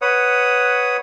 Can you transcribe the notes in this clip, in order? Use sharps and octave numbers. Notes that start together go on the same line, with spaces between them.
B4 C#5 F#5 D#6